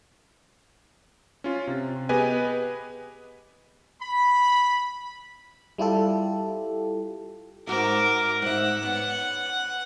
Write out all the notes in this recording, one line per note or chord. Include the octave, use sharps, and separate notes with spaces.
C#4 F4
C3
B3 G4 G#4 B4 D#5 G#5
B5
G3 E4 F4 G4 A4
G#2 F#4 A#4 E5 D6
G#2 E5 F#5
B3 C#5